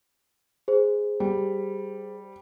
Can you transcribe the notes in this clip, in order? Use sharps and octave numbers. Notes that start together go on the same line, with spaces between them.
G#4 C5
G3